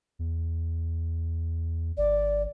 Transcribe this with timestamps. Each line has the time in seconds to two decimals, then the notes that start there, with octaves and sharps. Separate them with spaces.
0.19 E2
1.97 G#1 D5